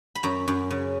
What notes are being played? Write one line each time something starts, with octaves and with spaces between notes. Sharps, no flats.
B5
F#2 A#5
F#2
C#3